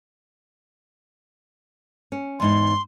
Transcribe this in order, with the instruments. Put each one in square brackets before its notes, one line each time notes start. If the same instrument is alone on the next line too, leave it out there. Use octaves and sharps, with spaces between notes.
[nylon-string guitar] C#4
[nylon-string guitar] E2 G#2 D#4 [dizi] C6